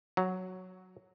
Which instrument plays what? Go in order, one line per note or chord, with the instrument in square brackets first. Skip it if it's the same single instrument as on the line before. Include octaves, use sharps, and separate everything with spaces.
[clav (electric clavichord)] F#3